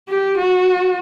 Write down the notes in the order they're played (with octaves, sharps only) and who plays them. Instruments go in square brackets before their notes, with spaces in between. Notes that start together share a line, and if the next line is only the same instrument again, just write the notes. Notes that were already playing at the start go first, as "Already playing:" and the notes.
[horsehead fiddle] G4
F#4